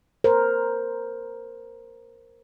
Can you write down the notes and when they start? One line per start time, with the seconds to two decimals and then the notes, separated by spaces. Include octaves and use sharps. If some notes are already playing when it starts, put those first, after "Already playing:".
0.24 A#4 C5